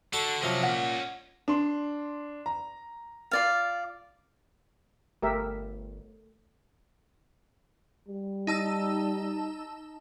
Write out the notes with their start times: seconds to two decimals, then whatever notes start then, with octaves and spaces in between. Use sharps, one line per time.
0.13 D3 F#4 A4 A5
0.42 C3 F3 F#3 C#4 D#5
0.63 A#2 F#5
1.48 D4 C6
2.46 A#5
3.31 F4 D5 F5
5.22 G1 A3 G4 A#4 E5
8.08 G3
8.47 D#4 A5 E6